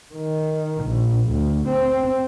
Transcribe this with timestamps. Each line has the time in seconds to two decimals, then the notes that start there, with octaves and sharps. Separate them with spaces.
0.15 D#3
0.85 A#1
1.31 D2
1.69 C4